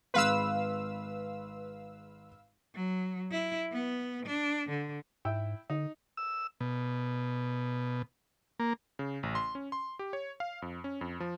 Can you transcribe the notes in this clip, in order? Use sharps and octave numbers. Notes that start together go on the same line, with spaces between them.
G#1 G#3 B4 F5 C6 E6
F#3
E4
B3
D4
D3
G#2 E4 G5 E6
D3 D#4
E6
B2
A#3
C#3
A1
C6
C#4
C6
G4
C#5
F5
F2
C#4
F2
F3